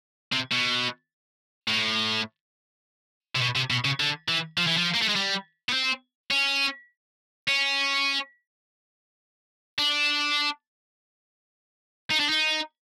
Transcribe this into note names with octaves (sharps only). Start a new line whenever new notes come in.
C3
B2
A2
C3
B2
C3
B2
C#3
D3
E3
F3
E3
F3
A#3
A3
G#3
G3
B3
C4
C#4
C#4
D4
D#4
D4
D#4